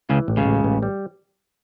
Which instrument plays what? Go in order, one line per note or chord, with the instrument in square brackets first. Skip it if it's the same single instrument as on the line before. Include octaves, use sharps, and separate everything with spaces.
[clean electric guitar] C#2 C#3 [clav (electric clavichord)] E3
[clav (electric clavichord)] A1
[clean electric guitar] C#2 C#3
[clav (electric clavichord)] A1
A1
G3